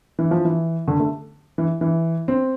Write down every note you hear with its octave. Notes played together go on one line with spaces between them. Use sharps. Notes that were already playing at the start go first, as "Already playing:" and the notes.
E3
F3
E3
D3
A3
E3
E3
C4